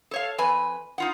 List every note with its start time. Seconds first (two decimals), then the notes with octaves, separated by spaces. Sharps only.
0.11 A4 C#5 F5
0.38 F2 B4 G#5
0.98 D#4 F4 F#5